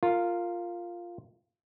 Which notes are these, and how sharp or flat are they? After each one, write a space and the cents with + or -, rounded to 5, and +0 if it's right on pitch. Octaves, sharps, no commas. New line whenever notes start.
F4 +0 A#4 -20